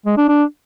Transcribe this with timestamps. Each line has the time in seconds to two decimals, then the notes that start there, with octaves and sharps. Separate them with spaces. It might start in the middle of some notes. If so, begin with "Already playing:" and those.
0.06 G#3
0.17 D4
0.28 D4